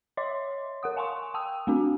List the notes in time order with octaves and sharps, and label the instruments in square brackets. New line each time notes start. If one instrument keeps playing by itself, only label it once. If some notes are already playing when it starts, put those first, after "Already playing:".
[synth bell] C#5 D#5 E5 C6 D6
A#4 F#5 D#6
F5 G#5 A5 C6 C#6
G5 A5 D#6 E6
A3 C4 D4 F#4